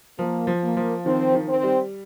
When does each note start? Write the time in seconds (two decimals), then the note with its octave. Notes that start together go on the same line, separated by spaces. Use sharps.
0.19 F3 A#3
0.47 F3
0.63 A#3
0.77 F3
1.05 D#3 C4
1.35 D#3
1.48 C4
1.63 G3